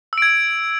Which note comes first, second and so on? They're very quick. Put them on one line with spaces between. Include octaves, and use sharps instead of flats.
E6 D7 G#6